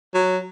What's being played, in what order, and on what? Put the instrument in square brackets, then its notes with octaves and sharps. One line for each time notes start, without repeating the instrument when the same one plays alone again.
[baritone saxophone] F#3